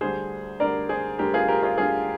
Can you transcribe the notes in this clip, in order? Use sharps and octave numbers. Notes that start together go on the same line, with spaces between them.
D2 D3 G3 G#4 C5
D2 D3 G3 A#4 D5
G#4 C5
D2 D3 G3 G4 A#4
F4 G#4
G4 A#4
F4 G#4
D2 D3 G3 F4 G#4